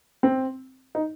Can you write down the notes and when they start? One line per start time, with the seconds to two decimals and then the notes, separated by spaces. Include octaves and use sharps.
0.23 C4
0.95 D#4